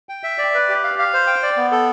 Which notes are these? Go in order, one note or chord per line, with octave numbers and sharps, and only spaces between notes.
G5
E5
D5
B4
G4
F5
F5
C5
G5
D5
B3
A4